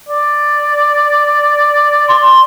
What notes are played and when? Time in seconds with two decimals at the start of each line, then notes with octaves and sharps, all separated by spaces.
0.08 D5
2.08 C6